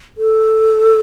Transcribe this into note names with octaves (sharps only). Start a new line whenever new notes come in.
A4